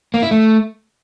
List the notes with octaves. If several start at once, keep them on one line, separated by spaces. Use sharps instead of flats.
A#3
E4
A3